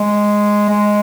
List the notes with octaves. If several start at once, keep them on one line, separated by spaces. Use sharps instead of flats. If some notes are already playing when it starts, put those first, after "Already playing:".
Already playing: G#3
G#3